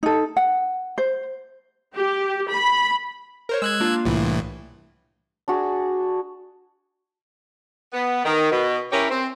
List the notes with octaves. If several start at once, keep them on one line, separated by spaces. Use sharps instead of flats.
D#4 A4
F#5
C5
G4
B5
A#4 C5 C#5
G#3 E6 F#6 G#6
A#3 D4 F4
C2 A2 E3
D4 F#4 G#4
B3
D#3
B2
C#4 E4 G4 A#4 C#5
C4